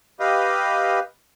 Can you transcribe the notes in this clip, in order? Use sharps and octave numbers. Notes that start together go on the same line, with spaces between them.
G4 B4 D#5 F5